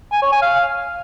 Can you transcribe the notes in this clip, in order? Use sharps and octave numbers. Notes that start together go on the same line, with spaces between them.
G#5
C#5
G#5
F5